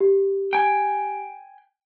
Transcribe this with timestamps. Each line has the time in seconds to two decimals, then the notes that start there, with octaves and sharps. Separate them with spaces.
0.01 G4
0.53 G5 G#5